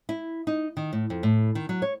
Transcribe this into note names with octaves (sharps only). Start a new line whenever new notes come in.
E4
D#4
D#3
A2
F2
A2
D#3
F#3
C#5